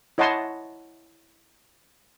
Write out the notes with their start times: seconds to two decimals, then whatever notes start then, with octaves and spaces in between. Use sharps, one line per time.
0.18 E4 C#5 D#5 F#5 A5 C6